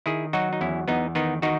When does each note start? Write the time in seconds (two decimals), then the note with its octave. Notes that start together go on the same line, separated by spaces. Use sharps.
0.06 D#3 E4 G#4
0.33 F#3 D#4 F#4
0.53 D#4
0.61 E2 C#4 E4
0.88 E2 B3 D#4
1.15 D#3 B3 D#4
1.42 D#3 D#4 F#4